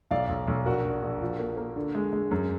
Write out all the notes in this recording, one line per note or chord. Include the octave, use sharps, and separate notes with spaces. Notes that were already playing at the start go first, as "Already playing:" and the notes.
B1 D5 F5
B1
B1
A#1 F#4 A#4
A#1
A#1
F3
A#3
A#3
D3
G#3
G#3
F#2